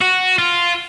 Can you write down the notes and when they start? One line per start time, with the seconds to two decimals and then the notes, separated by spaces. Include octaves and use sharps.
0.01 F#4
0.38 F4